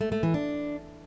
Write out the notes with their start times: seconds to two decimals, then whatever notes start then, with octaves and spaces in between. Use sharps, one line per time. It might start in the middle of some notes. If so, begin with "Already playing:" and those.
0.01 A3
0.12 A3
0.23 E3
0.34 D4